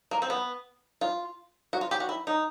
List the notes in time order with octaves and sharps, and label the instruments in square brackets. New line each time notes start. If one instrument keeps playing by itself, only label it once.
[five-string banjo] A#3
C4
B3
F4
F#4
F4
G4
F#4
E4
D#4